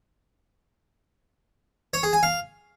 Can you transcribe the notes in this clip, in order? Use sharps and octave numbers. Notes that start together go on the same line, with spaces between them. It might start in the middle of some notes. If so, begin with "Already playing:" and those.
C#5
G#4
G#5
F5